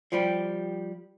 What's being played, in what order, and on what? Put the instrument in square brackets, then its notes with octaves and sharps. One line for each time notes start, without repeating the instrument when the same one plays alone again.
[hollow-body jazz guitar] F3 G3 G4